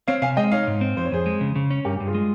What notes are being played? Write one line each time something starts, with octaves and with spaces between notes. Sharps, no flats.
C4 C#5 F5
C3 F5 G#5
G#3 D#5 G5
D#4 C#5 F5
G#2
C4
F2 C5
C#5
F2 G#4 C5
G#3
C#3
C#3
C#4
G2 G4 A#4
G2 G4
F4 G#4
G#3